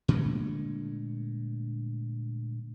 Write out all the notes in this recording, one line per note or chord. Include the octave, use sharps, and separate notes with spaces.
A#2 D3 G#3 A3